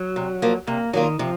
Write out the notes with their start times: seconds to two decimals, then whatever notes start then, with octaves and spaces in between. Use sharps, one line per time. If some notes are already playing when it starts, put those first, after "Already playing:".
Already playing: F#3
0.16 C3
0.42 F3 A#3
0.67 C3 A#3
0.93 D#3 F#3 A#3 F4
1.19 C3 F3